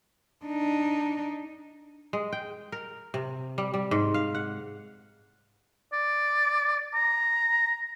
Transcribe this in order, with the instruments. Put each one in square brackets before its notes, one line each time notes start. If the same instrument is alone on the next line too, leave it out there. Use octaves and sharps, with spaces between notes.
[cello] D4 D#4
[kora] G#3
G5
A#4
C3
G3
G3
G#2
F5
F#5
[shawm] D5
A#5